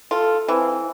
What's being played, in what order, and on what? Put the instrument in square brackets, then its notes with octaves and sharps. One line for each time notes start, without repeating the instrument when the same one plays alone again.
[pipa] F4 [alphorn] A4
[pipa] E3 [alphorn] C4